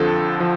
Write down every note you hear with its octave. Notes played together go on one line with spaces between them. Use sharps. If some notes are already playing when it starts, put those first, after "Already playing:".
Already playing: F2 D3 F3 A4
F3